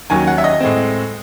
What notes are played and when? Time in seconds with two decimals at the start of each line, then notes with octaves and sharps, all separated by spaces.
0.10 D#2 D#3 F#3 C#4 G#5
0.27 F#5
0.38 E5
0.44 D#5
0.60 A2 G#3 C4